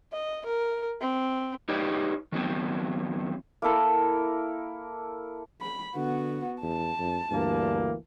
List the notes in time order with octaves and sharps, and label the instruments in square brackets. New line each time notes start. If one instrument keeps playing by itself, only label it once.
[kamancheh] D#5
A#4
C4
[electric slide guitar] D#4 G4 B4 C#5 D5
D#3 F#3 B3 C4
[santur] A#3 E4 A4 A#4
[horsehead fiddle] B5
[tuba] D3 [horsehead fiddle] B3 F#4
[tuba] E2 [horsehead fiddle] A5
[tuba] F2
[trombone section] D2 E3 A#3 [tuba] G2